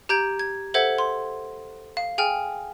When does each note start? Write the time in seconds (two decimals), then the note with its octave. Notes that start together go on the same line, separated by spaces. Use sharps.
0.09 G4 A#5 G6 G#6 D7
0.39 G#6
0.74 A4 C5 E5 F#5 G#6
0.98 C6
1.97 F5
2.18 G#4 G5 G#5 F6